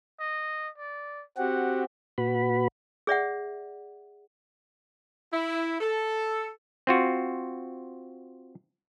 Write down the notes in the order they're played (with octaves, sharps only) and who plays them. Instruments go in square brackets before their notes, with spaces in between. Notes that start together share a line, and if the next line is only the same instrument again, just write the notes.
[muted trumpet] D#5
D5
[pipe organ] C4 F#4 G4 [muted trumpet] F#5
[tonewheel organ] A#2 F#4 B4 B5
[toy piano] G#4 D5 E5 F#5
[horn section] E4
A4
[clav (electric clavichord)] C4 F4 F#4